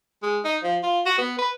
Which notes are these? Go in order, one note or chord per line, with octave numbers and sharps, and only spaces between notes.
G#3
D#4
F3
F4
F#4
B3
B4